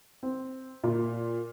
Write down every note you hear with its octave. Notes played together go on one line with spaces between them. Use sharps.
C4
A#2